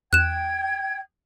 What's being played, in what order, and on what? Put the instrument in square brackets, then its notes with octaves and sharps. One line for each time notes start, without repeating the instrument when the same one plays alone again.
[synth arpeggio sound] E2 [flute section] G5 G#6 [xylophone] F#6 E7